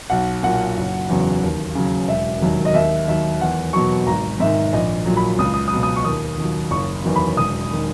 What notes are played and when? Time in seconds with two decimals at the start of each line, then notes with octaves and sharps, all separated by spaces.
0.10 B1 F#5
0.43 A#2 F#3 F#5
0.77 F#1
1.09 E2 C#3 F#3
1.43 D#2
1.75 C#3 F#3
2.08 E1 E5
2.41 D#2 D#3 F#3
2.65 D#5
2.74 D#2 E5
3.08 D#3 F#3 E5
3.40 E2 F#5
3.73 B2 F#3 C#6
4.07 G#1 A#5
4.40 G#2 D#3 E5
4.73 A#1 D#5
5.06 A#2 F#3
5.17 B5
5.39 C#2 D#6
5.54 D#6
5.68 D#6
5.72 B2 F#3
5.83 D#6
5.96 C#6
6.05 D#2 D#6
6.38 D#3 F#3
6.71 F#1 C#6
7.04 E2 D#3 F#3
7.16 B5
7.37 E1 D#6
7.73 D#3